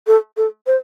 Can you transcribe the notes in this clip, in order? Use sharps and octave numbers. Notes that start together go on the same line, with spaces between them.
A4
A4
C5